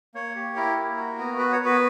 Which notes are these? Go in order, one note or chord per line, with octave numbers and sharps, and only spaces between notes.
A#3 C#5
G4
E4 A#4
A#3
F#4
B3
F#4 B4
C#5
B3
B4